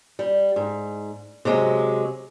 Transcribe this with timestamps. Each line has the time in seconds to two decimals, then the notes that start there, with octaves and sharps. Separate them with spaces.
0.19 G3
0.56 G#2
1.45 C3 F#3 G#3